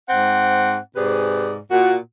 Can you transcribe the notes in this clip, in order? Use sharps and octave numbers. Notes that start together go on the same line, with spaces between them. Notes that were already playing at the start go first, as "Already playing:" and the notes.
G#2 C4 F#5
G#2 C3 G#4 B4 D5
A#2 F#4